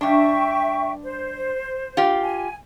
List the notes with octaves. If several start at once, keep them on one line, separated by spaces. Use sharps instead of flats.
G2 D4 E5 G5 C#6
C5
F4 G4
G#5